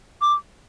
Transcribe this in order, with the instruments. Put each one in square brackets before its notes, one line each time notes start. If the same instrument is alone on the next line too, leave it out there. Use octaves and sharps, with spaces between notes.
[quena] D6